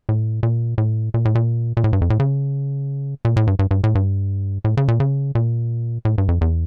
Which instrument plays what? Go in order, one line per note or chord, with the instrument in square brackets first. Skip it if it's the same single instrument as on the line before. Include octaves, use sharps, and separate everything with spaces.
[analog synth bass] A2
A#2
A2
A#2
A2
A#2
A#2
A2
G2
F2
A2
C#3
A#2
A2
G2
G2
G2
A2
G2
A2
C#3
A#2
C#3
A#2
A2
G2
F2
E2